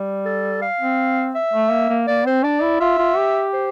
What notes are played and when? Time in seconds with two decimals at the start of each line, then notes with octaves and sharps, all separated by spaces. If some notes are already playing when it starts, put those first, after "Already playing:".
Already playing: G3
0.26 A4
0.62 F5
0.80 C4
1.35 E5
1.53 A3
1.71 A#3
1.89 A#3
2.07 A#3 D5
2.27 C4 C5
2.44 D4 D5
2.63 E4
2.80 F4 E5
2.99 F4
3.17 G4
3.54 C5